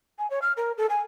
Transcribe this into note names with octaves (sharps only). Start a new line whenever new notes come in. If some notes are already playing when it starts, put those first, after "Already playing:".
G#5
C#5
F6
A#4
A4
G#5